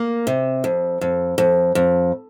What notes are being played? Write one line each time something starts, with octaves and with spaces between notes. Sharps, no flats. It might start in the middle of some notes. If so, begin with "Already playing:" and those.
Already playing: A#3
C3
F2
F2
F2
F2